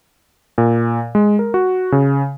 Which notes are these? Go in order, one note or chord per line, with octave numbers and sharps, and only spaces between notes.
A#2
G#3
A#4
F#4
C#3